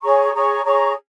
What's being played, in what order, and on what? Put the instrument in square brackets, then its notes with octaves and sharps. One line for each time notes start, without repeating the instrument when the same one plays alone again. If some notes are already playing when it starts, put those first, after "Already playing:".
[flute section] G#4 C#5 A#5 C#6
G#4 C#5 A#5 C#6
G#4 C#5 A#5 C#6